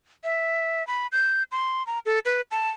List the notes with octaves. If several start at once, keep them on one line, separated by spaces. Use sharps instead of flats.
E5
B5
G6
C6
A#5
A4
B4
A5